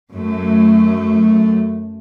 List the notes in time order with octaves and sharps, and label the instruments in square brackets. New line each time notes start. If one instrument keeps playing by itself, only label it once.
[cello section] F#2 A3